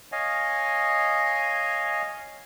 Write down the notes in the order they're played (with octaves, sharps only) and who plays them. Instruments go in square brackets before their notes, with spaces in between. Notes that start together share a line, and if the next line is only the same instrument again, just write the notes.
[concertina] C#5 D#5 F5 G#5